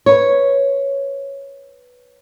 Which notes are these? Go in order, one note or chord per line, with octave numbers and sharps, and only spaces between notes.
B4 C#5